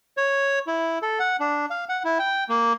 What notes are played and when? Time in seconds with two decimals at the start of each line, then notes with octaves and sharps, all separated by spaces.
0.17 C#5
0.67 E4
1.02 A4
1.20 F#5
1.40 D4
1.70 F5
1.89 F#5
2.04 E4
2.19 G5
2.49 A#3